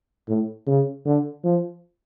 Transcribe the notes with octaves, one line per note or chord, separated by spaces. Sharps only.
A2
C#3
D3
F3